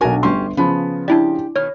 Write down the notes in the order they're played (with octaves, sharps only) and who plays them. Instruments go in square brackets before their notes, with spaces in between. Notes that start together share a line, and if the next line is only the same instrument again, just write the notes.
[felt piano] B1 F#4 [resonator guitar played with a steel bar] D4 A#4 G#5
[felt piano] G1 D3 C6 [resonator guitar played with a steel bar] C#4 G4
[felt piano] C#3 F3 [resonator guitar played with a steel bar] B3
[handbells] D4 E4 D5 [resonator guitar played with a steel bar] G4
[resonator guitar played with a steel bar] B2 D#3 [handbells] C#5 F6